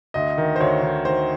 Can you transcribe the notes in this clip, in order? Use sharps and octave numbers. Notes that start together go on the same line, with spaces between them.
D2 D#5
D#3
C5
D2 C#5
D#3
D#3 C5